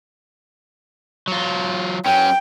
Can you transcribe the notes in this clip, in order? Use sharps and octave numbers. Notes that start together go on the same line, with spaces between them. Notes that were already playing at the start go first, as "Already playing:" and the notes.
F#3 F4
F#3 C#4 G5